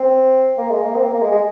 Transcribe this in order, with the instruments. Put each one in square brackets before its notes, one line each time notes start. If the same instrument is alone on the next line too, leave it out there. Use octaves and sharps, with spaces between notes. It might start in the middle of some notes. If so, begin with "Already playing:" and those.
Already playing: [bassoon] C4
A#3
G#3
A#3
C4
A#3
A#3
G#3
G#3